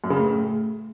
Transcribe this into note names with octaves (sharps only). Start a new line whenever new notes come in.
F#2
C#3
A2